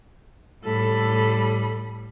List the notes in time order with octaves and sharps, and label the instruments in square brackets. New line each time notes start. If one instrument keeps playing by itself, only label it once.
[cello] A2 G3 [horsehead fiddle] A4 B5